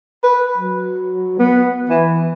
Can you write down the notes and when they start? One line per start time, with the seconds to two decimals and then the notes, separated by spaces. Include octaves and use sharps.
0.23 B4
0.58 F#3
1.39 B3
1.89 E3